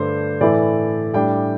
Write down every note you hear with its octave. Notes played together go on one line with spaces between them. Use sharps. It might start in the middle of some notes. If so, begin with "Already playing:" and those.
Already playing: G2 D3 A3 D4 C5
A2 E3 A3 E4 D5
A2 G3 D4 G5